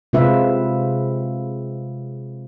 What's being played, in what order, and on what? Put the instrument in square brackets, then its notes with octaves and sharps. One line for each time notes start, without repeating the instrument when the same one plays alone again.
[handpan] C3 G#3 C4 F4 B4 E5